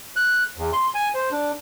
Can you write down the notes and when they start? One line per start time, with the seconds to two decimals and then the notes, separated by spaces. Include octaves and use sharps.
0.16 F#6
0.57 E2
0.73 C6
0.94 G#5
1.15 C5
1.32 D4